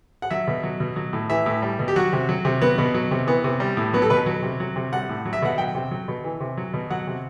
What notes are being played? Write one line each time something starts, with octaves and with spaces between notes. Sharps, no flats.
F#5
F#3 E5
B2
F#3
B2
F#3
A2
E3 E5
A2
G3
B2
G4
F#3 F#4
C3
F#3
C3
F#3 B3
B2
F#3
C3
E3 B3
C3
G3
A2
F#3 B3
A4
B2 B4
F#3
C3
F#3
C3
G3 F#5
A2
F#3
E5
B2 F#5
F#3 G5
C3
F#3
B2
E3
C3
F#3
B2
F#3 F#5
C3